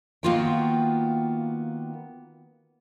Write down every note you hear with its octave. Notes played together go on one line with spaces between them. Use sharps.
D#3 A#3 B3 F4 F#4 G5